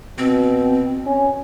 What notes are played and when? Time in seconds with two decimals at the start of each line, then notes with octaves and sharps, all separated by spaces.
0.18 B2 C4
1.06 C#4